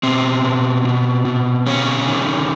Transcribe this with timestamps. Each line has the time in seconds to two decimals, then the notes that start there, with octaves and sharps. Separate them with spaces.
0.03 B2 C4
0.44 B2
0.85 B2
1.25 B2
1.66 C3 C#4
2.06 D#3